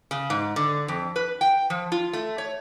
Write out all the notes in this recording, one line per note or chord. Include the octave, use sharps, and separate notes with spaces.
C#3
G#2
D3
F2
B4
G5
F3
F4
A3
C#5